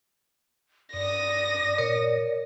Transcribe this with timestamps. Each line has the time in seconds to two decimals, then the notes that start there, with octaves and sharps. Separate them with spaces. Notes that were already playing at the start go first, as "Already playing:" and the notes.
0.93 G2 D5 D#6 A#6
1.78 A#2 A#4 C#5